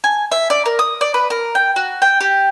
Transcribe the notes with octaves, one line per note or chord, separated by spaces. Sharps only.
G#5
E5
D5
A#4
D#6
D5
B4
A#4
G5
F#4
G5
G4